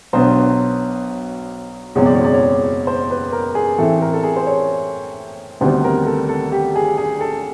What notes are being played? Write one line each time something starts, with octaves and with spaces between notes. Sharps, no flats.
B1 B2 F#3 B3 D4 C5
F#1 E2 B2 G#3 C4 C#5
D5
C#5
D5
C#5
C5
B4
A#4
G#4
A2 E3 A3 C4 A4
A#4
A4
G#4
C5
C#5
D2 C3 D#3 G3 B3 C5
A#4
A4
A4
G4
G#4
G#4
A4